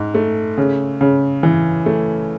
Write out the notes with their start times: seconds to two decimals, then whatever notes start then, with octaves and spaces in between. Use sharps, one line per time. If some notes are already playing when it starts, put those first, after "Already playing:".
Already playing: G#2
0.15 A3
0.57 C#3
1.01 C#3
1.43 E3
1.86 A3